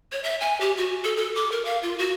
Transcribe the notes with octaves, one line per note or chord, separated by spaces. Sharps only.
C#5
E5
G#5
G4
F#4
A4
A4
D6
A#4
F5
F4
F#4